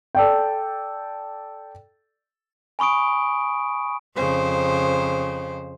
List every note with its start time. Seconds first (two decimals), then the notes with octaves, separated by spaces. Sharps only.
0.15 A4 D5 G5
2.79 G#5 B5 C#6 D#6 D7
4.17 F2 C#3 C5